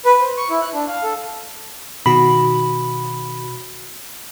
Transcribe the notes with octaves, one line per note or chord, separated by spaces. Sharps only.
B4
C5
C#6
E4
F#6
D4
F5
A4
B2 D#3 F#4 B5